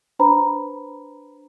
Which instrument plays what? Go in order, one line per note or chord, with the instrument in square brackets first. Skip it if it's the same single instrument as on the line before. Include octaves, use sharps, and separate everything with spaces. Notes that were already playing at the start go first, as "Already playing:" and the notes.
[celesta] D4 B4 C5 A#5 B5